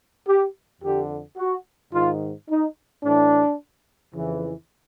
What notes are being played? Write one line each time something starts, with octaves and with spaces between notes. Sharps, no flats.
G4
F2 D3 G4
F#4
G#2 D#3 F4
D#4
A2 E3 D4
F2 C#3 E3